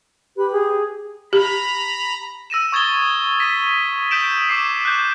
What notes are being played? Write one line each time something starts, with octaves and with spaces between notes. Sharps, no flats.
G4 B4
G#4
G4 A#5 B5
E6 A#6 D#7 E7
C#6 D#6 G#6 A6 D#7 G7
D#6 A#6 B6 D#7
D#6 G6 B6 D7 E7 F#7
D6 D#6 C7
F#6 G6